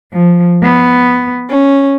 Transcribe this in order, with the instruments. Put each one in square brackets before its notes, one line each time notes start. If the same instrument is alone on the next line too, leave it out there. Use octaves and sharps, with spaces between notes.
[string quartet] F3
B3
C#4